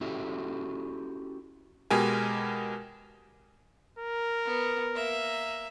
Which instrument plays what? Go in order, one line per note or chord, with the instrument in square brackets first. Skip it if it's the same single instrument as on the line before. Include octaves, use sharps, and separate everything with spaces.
[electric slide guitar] C#4 E4 F#4 G4 A4 E5
[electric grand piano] B2 G#3 G4 A#4 G#5
[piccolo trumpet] A#4
[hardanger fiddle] B3
A#3 E5